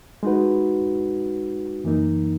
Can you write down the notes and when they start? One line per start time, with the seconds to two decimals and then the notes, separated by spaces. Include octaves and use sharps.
0.23 G#3 D#4 F#4 B4
1.84 F#2 E3 A#3 D#4